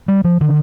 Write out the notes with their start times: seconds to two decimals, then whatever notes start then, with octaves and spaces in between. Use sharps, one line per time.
0.08 G3
0.24 F3
0.41 D3 D#3